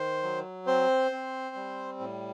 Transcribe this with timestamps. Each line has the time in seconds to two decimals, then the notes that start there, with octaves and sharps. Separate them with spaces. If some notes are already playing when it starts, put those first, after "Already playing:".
Already playing: D#3 C5 C6
0.23 F#3
0.66 C4 C5 C6
1.11 C4
1.55 G3
2.00 A2